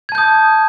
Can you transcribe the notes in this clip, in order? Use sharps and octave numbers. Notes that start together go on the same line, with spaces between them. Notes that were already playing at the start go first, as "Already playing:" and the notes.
A5 D#6 G6 G#6